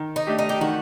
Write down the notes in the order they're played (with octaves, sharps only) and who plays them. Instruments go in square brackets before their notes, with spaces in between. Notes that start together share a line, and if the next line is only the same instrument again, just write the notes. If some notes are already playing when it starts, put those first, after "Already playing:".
Already playing: [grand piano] D#3
[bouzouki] D#4
[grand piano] A3 D4 G4
[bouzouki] D#4
G4
[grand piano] D#3 [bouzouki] F#4